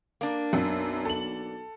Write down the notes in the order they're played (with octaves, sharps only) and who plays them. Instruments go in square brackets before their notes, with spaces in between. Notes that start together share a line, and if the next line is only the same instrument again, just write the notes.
[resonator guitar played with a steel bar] A#3 D4
[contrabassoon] B1 [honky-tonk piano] F#2
[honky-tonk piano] A4 F#7